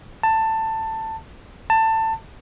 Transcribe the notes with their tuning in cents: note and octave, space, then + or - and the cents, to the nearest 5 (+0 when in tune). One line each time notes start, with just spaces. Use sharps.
A5 +15
A5 +20